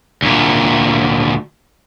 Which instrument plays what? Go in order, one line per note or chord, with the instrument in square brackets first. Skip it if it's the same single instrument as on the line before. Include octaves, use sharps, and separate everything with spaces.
[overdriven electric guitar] D2 A#2